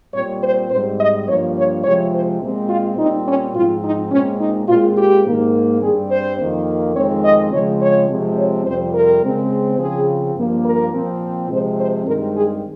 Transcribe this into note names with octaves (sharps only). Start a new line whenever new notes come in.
A#2 G3 C4 C#5
C5
G#2 G3 C4 C5
D#5
G2 F3 A#3 C#5
C#5
C3 F3 G#3 C4 C#5
C5
A#2 G#3 C4
F4
A#2 G3 C4 D#4
C#4
G#2 F3 C4 F4
D#4
A#2 G#3 C4 C#4
D#4
A#2 G#3 C4 F4
G4
G#2 D#3 A#3
G2 G3 C4 G#4
C5
F2 D#3 A#3
F2 D#3 G#3 C4 C#5
D#5
C#3 F3 G#3 C4 C#5
C#5
C3 F3 G#3 C4
C#5
F2 C3 G3 C4 C5
A#4
C#3 G#3 C4
C#3 F3 C4 G#4
G2 F3 A#3
A#4
A#2 F3 C4
C3 F3 G#3 C4 C5
C5
G2 D#3 G#3 C4 A#4
G#4